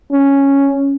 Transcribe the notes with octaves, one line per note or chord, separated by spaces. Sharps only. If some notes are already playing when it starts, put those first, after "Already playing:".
C#4